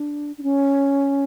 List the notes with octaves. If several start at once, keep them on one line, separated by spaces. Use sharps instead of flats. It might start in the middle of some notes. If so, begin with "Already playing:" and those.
Already playing: D4
D4
C#4